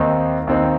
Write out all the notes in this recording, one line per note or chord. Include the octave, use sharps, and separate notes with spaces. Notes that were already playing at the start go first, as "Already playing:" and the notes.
Already playing: D#2 D#3 C4 D#4
D#2 D#3 C4 D#4